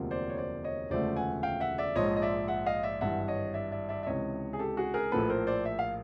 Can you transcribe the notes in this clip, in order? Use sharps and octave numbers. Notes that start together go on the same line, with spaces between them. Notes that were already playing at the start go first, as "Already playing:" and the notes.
Already playing: E1 D2 C3 F3 A#3
C5 D5
C#5
C5 D5
C#5 D#5
E1 D2 C#3 F3 A3 C5 D5
F#5 G#5
F5 G5
E5 F#5
D5 E5
A#1 G#2 F3 G#3 C#5 D#5
D#5
D5 E5
E5 F#5
D#5 F5
D5 E5
G#1 G2 E3 E5 F#5
C#5 D#5
D5 E5
D5 E5
D5 E5
E5
C#2 C3 E3 C#5 D#5
G#4
G4 A4
F#4 G#4
G#4 A#4
A#1 A2 F3 A#3 A4 B4
A#4 C5
C5 D5
E5
F5